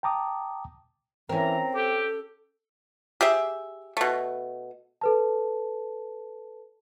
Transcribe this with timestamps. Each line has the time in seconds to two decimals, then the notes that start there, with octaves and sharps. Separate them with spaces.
0.03 G5 A5 A#5 D6 D#6
1.29 E3 C4 C#4 A#4 A#5
1.74 G4 A4
3.21 G4 G#4 E5
3.97 B2 A3
5.01 A4 B4 A5